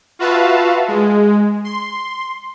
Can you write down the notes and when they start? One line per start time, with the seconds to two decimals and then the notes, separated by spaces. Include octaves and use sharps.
0.19 F4 F#4 B4 E5 F5 A5
0.88 G#3
1.65 C6